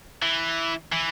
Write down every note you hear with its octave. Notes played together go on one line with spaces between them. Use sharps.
E3
E3